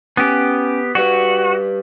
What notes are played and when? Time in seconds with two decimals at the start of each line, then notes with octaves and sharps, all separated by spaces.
0.17 B3 C#4 G4 G#5
0.95 G3 F#4 B4